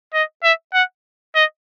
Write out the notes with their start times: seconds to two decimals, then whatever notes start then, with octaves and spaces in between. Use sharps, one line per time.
0.13 D#5
0.43 E5
0.73 F#5
1.35 D#5